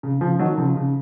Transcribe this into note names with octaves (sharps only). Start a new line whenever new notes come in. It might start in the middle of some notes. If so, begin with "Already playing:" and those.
C#3
C#3 F3
D#3 F#3
C#3 F3
C#3